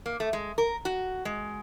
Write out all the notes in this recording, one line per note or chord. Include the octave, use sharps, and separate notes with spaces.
A#3
A3
G#3
A#4
F#4
G#3